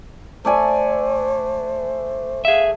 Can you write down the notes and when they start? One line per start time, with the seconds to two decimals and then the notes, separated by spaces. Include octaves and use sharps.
0.45 A3 C5 D5 G#5
2.45 G#4 E5 F5